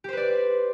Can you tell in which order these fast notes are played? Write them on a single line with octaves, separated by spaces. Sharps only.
G4 C5 B4 D5